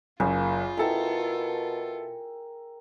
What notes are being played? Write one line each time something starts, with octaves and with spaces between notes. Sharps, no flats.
F#1 A#3 F4 G#4
B2 E4 A4 A#4 G5